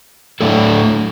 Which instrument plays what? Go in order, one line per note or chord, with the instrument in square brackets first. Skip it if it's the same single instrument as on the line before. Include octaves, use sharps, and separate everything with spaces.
[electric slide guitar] A2 F#3 A3 D4 A4